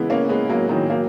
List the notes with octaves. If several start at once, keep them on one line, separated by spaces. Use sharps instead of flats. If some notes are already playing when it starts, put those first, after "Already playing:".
Already playing: C#3 E3 G#3 B3
A#3 C#4
G#3 B3
F#3 A#3
D#3 F#3
F#3 A#3